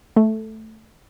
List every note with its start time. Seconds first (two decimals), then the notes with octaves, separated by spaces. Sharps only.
0.16 A3